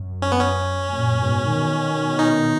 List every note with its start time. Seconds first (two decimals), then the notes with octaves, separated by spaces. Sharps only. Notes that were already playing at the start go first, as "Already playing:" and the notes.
Already playing: F#2
0.22 C#4
0.32 B3
0.41 C#4
0.87 F#2 A#2
1.21 G#2 B2
1.53 B2 D#3
2.19 D#4